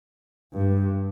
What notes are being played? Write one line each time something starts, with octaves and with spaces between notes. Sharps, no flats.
G2